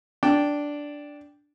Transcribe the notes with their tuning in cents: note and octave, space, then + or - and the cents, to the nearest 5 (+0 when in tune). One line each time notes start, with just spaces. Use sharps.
D4 -5 G5 +0